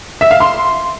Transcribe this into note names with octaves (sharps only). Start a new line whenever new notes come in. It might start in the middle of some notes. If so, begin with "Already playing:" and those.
E5
F5
C6